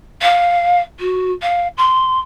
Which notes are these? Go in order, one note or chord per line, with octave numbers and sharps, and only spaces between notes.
F5
F#4
F5
C6